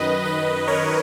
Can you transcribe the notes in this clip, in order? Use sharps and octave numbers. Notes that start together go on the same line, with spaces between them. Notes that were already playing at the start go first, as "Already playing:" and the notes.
Already playing: F#2 D#3 B4 D#5
B4 D#5
A#4 C#5